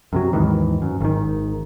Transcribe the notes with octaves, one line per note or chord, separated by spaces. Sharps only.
F#2 C3 F#3
D#2 G#2 D#3 E3
F#2
G#1 D#3